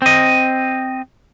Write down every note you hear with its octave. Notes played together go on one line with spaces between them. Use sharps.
C4 D#5